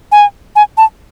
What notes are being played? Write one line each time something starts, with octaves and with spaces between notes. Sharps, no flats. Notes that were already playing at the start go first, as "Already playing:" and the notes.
G#5
G#5
A5